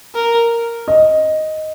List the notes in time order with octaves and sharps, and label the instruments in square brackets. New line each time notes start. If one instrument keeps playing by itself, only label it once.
[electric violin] A#4
[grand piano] D#5